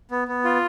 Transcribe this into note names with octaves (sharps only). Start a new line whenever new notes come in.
B3
B3
F4